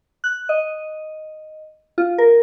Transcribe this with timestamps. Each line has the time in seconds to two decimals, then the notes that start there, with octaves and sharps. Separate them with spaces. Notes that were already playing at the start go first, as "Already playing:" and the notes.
0.24 F#6
0.49 D#5
1.98 F4
2.18 A#4